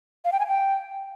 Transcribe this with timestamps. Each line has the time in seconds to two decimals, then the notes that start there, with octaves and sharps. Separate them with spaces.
0.25 F5
0.32 G5
0.40 G#5
0.47 G5